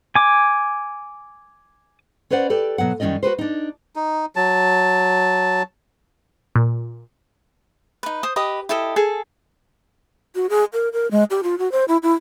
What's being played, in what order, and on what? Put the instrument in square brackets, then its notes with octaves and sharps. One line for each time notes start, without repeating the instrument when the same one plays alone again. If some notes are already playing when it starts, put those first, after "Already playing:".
[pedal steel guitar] G#5 D6
[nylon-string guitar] C#4 B4 C5 D5 F#5
G4 A4 B4 D5
B2 F#3 B3 F#5
F#2 D#3 G3 C#4 D5 D#5
F#4 G4 B4 C5
D4 D#4
[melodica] D#4
F#3 A5
[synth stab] A#2
[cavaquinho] D#4 B4
C5 D#6
G4 B4 D#5 D#6
E4 G4 A4 D#5
G#4 A4 G#5
[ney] F#4
G#4
A#4
A#4
G#3
G4
F4
F#4
C5
E4
E4